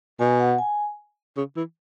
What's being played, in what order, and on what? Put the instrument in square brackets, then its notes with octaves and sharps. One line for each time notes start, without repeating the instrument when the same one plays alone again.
[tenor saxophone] B2 [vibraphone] G#5
[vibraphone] F#5
G#5
[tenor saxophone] C#3
E3